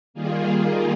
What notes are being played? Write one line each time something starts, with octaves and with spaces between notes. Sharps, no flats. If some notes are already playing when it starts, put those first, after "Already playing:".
D#3 G3 A#3 F4 G#4